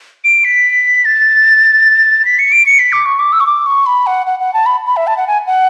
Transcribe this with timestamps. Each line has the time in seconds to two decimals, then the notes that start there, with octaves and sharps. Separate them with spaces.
0.24 D7
0.45 B6
1.05 A6
2.25 B6
2.39 C#7
2.52 D7
2.66 C#7
2.79 B6
2.93 D6
3.06 C#6
3.19 D6
3.33 E6
3.40 C#6
3.46 D6
3.66 C#6
3.86 B5
4.07 F#5
4.27 F#5
4.40 F#5
4.54 A5
4.66 B5
4.87 B5
4.97 E5
5.07 A5
5.17 F#5
5.28 G#5
5.47 F#5